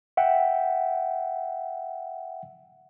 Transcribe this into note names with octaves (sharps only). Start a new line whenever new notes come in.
E5 F#5 G5